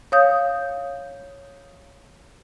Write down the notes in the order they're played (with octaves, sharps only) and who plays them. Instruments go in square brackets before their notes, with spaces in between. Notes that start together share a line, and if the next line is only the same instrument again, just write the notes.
[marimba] C#5 F5 D#6 G6